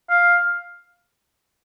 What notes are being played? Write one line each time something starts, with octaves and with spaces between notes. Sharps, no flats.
F5